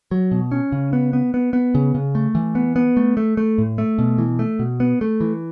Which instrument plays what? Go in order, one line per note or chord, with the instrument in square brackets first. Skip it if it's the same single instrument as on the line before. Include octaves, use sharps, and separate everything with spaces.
[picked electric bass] F#3
B2
C#4
C#3
B3
B3
B3
B3
C#3
C#3
A3
E3
B3
B3
A3
A3
A3
A2
A3
B2
E3
A3
B2
B3
A3
E3